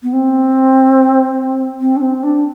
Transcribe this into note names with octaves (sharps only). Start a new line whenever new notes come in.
B3
C4
C4
D4
C4
D4